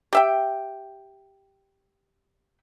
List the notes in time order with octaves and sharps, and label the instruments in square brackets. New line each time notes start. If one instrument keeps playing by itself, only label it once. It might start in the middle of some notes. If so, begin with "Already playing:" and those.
[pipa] G4 E5 G5